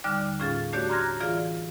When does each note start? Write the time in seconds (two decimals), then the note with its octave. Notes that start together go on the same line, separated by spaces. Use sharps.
0.04 D#2 D3 G3 D5 D6 F6
0.40 A2 C#4 F4 G#4 F5 A6
0.73 A3 D4 F#4 G4 C#5 D5
0.89 A#5 C6 F6 F#6 G#6 A#6
1.20 E3 F4 G#4 D5 F5